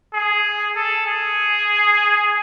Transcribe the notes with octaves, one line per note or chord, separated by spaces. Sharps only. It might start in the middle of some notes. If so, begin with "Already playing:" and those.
G#4
A4
G#4